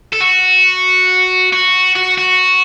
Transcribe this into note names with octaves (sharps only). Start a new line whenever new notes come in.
A4
F#4
F#4
F#4
F#4